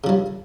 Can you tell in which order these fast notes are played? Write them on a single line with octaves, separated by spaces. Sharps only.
C#3 F3 G2